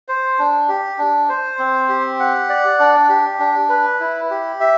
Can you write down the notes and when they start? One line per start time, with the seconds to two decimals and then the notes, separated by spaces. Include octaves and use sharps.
0.08 C5
0.39 D4
0.69 G4
0.98 D4
1.29 C5
1.59 C4
1.89 G4
2.20 F#5
2.49 D5
2.79 D4
3.09 G4
3.39 D4
3.69 B4
4.00 E4
4.30 G4
4.60 E5